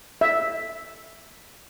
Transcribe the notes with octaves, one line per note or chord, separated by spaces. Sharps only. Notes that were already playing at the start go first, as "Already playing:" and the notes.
E5